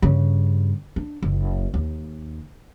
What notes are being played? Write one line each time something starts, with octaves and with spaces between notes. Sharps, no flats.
G2 C#3
D4
F#1
D#2